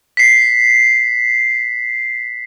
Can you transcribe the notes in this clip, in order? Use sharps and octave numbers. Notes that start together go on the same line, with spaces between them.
B6 C7